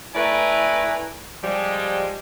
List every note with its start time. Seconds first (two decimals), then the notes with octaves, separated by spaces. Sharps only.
0.15 A3 E4 B4 D5 G#5 A#5
1.42 F3 G3 G#3